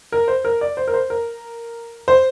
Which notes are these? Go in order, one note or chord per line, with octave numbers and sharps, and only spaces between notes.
A#4
C5
A#4
D5
C5
A#4
C5
A#4
C5